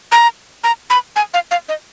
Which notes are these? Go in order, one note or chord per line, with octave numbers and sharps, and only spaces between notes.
A#5
A#5
B5
G#5
F5
F5
D#5